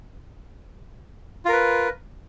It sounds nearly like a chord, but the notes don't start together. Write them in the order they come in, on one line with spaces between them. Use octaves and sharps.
F4 A#4 B4